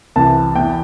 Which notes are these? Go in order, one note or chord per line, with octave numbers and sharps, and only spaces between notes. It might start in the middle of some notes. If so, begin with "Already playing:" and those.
C2 C3 E3 A5
E2 E3 G5